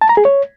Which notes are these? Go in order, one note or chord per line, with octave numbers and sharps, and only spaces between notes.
A5
A#5
G#4
C#5